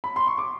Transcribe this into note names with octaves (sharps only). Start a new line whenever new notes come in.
B5
C6
C#6
D6